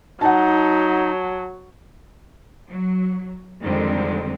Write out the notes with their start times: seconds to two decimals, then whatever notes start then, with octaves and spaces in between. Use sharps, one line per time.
0.21 F#3 D#4 F#5 A5
2.70 F#3
3.63 F2 D3 D#3 G3 G#3 C4